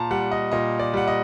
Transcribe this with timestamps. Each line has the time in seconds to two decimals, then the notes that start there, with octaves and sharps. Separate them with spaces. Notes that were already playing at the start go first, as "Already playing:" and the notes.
Already playing: A#2 A5 A#5
0.11 G3 F#5
0.31 D#5
0.52 A#2 D#5
0.79 D5
0.94 G3 F#5
1.08 D#5